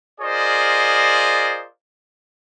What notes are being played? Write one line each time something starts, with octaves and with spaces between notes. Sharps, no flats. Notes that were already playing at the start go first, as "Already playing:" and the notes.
F4 G#4 A#4 C5 D5 D#5